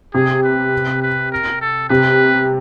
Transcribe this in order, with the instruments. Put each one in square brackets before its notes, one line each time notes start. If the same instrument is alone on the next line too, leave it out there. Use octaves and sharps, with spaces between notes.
[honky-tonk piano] C3 [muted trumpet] G#4
[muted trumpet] B4
B4
A#4
A4
[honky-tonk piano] C3 [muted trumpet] B4